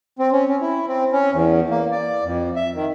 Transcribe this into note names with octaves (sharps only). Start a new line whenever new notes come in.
C4
C#4
C#4
E4
C4
C#4
E2
A#3
D5
F2
E5
D#3